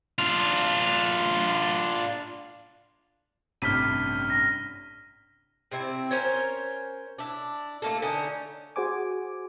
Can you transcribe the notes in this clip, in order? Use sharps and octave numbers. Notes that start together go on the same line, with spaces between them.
D4 F4
A1 G2 C3 F6 B6 D#7
A#6
C3 C4 E4
C#4 A#4 C5 C#5
D4 E4
A3 A#3 A4
D3 C#4 D#4
F#4 G#4 C5 G#5 D6